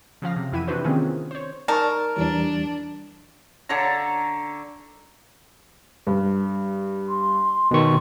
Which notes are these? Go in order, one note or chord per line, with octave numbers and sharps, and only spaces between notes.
C#3 F3 F5 A#6
C3
F2 E3 E4 E5 F#5 D#7
C3 D4 E4 F#4 B4 C5
D#3 A#3 C4 C#4 F4 G#4
C5 C#5
G#3 D#4 A#4 D5 A5 C#6
E2 E3 G3 D4
D3 A4 C#5 A#5
G2
C6
B2 D#3 C#6